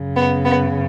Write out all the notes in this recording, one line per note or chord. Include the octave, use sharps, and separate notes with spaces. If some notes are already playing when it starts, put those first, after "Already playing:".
Already playing: F#2 C#3
B3
B3